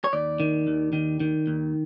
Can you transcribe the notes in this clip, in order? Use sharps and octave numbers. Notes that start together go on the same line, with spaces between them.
C#5
D#2 D5
D#3
D#2
D#3
D#3
D#2